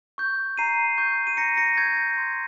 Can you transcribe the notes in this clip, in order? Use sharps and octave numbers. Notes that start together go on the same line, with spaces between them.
C#6 G6
A#5 C7 D#7
C#6 G6
D#7
A#5 A#6 C#7
A#6 C#7
C#6 G6 G#6
G6
C6